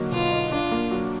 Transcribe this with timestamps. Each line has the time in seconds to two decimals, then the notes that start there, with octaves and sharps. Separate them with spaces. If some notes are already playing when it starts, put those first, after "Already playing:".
Already playing: D3 F#3 A#3 D#4
0.12 B2 F4
0.32 D#4
0.52 D4 F4
0.71 A#3
0.91 F#3